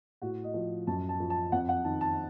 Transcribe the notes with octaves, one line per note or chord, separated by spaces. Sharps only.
A2 F#4
D#5
F3
F#2 A5
A5
F3
A5
F2 F#5
F#5
D#3 A5
A5